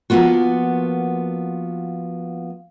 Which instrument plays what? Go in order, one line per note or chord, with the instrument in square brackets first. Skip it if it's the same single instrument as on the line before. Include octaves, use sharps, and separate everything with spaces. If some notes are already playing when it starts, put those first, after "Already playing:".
[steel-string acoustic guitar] F3 A#3 B3 F4 F#4